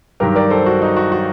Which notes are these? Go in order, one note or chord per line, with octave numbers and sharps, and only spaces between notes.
G2 D#3 F#3 G4 A#4
A#4 D5
A4 C5
F#4
D#4
F#4
F#4